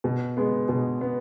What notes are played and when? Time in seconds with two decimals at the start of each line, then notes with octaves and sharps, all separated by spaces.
0.04 B2
0.37 G#3 B3
0.69 B2
1.01 B3